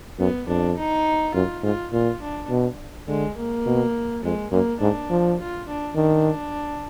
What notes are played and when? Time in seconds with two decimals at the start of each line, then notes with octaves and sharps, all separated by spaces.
0.19 F#2 B3
0.48 F2 D4
0.78 D#4
1.34 F#2 F4
1.63 G#2 F4
1.92 A#2 F4
2.21 D4
2.50 B2
3.08 D3 G#3
3.37 A#3
3.66 B2
4.24 F2 G#3
4.52 F#2 A#3
4.80 G#2 D4
5.10 F3
5.39 F4
5.68 D4
5.96 D#3 D4